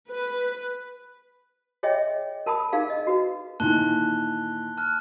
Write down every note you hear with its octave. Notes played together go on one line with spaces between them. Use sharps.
B4
G#4 C#5 D#5 E5 G5
A#4 A5 B5 D#6
D#4 G#4 A#4 F5
D#5
F#4 B4
A#2 D#3 E3 A5 F#6 G7
A5 F6 F#6